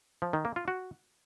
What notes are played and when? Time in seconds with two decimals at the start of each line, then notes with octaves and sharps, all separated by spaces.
0.22 F3
0.33 D#3
0.45 A#3
0.56 F4
0.68 F#4